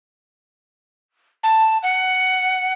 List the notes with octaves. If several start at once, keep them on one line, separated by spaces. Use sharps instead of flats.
A5
F#5